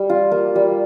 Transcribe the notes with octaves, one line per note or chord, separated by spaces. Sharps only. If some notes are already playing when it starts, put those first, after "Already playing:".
Already playing: G3
F4
A#3
G3